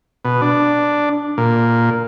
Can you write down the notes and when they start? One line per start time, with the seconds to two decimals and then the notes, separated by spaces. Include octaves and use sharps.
0.25 B2
0.41 D4
1.38 A#2